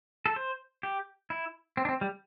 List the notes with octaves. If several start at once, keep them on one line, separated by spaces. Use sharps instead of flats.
A4
C5
G4
E4
C4
D4
C4
G3